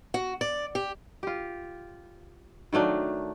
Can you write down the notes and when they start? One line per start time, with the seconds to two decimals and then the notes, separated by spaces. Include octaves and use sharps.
0.14 F#4
0.41 D5
0.75 G4
1.23 F4 G4
2.73 D#3 F#3 A3 D4